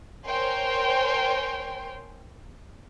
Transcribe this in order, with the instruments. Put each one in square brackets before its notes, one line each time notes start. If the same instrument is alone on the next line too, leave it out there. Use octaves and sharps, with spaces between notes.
[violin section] A#4 C5 C#5 G5 G#5 C6